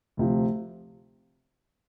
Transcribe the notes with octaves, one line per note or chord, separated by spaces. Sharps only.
D2 C3 F3